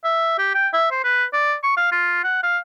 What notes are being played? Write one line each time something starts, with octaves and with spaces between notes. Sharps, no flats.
E5
G4
G5
E5
C5
B4
D5
C#6
F5
F4
F#5
F5